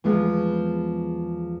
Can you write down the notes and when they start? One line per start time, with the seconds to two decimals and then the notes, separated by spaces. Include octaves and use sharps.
0.04 E2 F3 G#3 B3